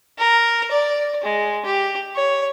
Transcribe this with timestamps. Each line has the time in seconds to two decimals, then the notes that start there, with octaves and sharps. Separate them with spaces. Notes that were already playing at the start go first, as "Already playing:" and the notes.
0.18 A#4
0.72 D5
1.24 G#3
1.65 G4
2.15 C#5